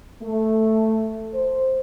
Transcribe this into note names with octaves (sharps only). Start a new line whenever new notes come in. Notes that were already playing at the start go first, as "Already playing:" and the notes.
A3
C5